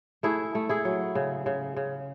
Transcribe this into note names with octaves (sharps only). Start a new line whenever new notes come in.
A3 E4 G#4
A3
E4 G#4
F#3
C#3
C#3
C#3